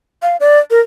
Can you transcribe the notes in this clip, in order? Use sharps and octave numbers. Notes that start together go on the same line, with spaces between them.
F5
D5
A#4